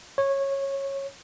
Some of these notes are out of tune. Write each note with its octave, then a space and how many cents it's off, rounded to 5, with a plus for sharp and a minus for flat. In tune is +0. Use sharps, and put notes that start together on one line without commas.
C#5 -15